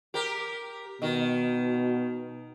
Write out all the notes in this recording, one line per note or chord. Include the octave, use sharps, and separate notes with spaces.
G4 A#4
B2 D#3